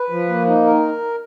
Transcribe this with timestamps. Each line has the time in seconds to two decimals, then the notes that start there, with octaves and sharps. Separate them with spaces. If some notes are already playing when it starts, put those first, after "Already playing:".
Already playing: B4
0.10 F3
0.28 A#3
0.47 D#4
0.64 D#3 A#4